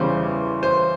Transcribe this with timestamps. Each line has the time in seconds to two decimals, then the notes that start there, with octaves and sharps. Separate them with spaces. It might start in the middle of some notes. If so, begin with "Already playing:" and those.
Already playing: E2 C#3 G3 C5
0.63 C5